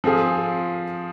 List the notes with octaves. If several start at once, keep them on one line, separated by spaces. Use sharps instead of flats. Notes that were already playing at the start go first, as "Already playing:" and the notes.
F3 C4 F4 G#4